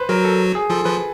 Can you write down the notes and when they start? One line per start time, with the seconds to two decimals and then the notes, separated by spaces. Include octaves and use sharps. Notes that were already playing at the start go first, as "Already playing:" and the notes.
Already playing: B4 C5
0.09 F#3 F#4 A#4
0.25 A4
0.55 G#4
0.70 F3 F4 A4
0.85 F3 F4 B4